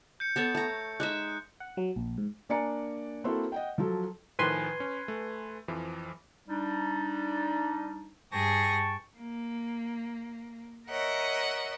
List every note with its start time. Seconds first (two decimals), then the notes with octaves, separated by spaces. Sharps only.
0.20 G6 C#7
0.36 B3 A4 C#5
0.55 A3 A#5
1.00 G#3 D#4 E5 F#6
1.60 F#5
1.77 F#3
1.96 A#1
2.18 G#2
2.49 A#3 D4 D5 G#5 A#5 C#7
3.24 A#3 C4 E4 F#4 A4 C5
3.52 D#5 F#5 G5
3.78 F3 F#3 A4
4.39 A2 D#3 F3 B4 G#5 C6
4.80 C#4
5.08 A3
5.68 F2 E3 F3
6.49 G3 D4 D#4
8.32 G2 G#4 G5 A5 C#6 A#6
9.18 A#3
10.89 A#4 C#5 D#5 E5 F#5